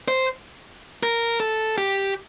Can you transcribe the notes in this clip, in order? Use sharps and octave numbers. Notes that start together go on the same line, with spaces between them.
C5
A#4
A4
G4